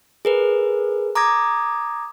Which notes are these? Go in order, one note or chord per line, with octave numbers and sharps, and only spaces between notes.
G#4 A#4 B4
A#5 D6 D#6 G#6 A#6